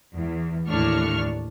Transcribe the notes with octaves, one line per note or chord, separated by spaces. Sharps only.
E2 E3
D#2 A2 D4 C#6 F6